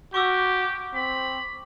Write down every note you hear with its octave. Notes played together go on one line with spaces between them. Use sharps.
F#4 G4 C#6 D6 E6
C4 B5